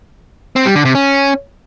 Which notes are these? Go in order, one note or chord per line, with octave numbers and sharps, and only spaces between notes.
C4
G3
D3
C3
C#4